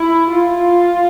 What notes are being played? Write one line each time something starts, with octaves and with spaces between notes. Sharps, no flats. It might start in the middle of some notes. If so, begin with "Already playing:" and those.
Already playing: E4
F4